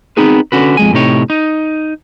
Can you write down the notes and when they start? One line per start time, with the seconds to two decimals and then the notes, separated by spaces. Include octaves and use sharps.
0.17 B3 C4 D#4 G#4 B4
0.52 D3 C#4 F#4 B4
0.77 F2 G#3 G#5
0.93 A2 C3 D#4 C#5
1.30 D#4